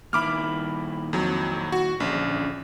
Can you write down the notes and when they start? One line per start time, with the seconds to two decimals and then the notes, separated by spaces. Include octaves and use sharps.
0.13 A#2 D#3 E4 B5 D6 F6
1.13 F2 F#3
1.72 F#4
2.00 A#1 D3 C#4